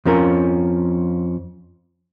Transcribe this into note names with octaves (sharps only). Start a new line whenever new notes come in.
F2 F3 C#4 A#4